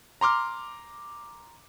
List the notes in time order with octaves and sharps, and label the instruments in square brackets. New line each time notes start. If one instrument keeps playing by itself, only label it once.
[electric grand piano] A#5 C6 D6 F6